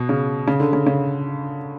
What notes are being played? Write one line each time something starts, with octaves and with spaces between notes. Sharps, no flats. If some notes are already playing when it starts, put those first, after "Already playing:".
Already playing: B2
C#3
C#3
D3
C#3
C#3